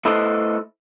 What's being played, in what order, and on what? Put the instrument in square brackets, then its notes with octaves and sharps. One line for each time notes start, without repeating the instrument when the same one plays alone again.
[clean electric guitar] A3 E4 A4 B4 C5 D#5